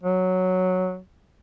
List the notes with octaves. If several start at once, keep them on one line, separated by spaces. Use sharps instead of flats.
F#3